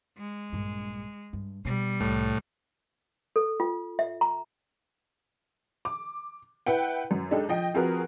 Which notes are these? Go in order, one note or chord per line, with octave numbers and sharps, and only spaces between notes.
G#3
A#1 G2
G2
B2 G3
C2 A2
A4
F4
E5
A#5
D6
E4 B4 F#5 G5
F#2
G#3 D4 D#4 G4 A4
F3 D#5 G5
F3 C4 F#4 G#4 A#4 B4